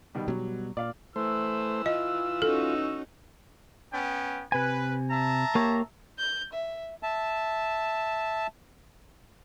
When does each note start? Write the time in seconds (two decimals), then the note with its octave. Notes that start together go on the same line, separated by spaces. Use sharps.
0.15 B2 D#3 G3
0.28 B2 F#3 G3
0.77 A#2 D5 F5
1.16 E3 A3 C5 E6
1.86 F4 D#5
2.42 C#4 D#4 F#4 A4
3.92 B3 C#4 G5
4.52 C3 B4 G#5
5.10 E5 A5 A#5
5.55 A#3 G4 C#5
6.18 G6
6.53 E5
7.03 E5 A5